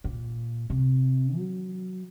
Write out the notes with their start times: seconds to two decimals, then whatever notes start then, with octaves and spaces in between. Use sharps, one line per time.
0.04 A#2
0.70 C3
1.36 F#3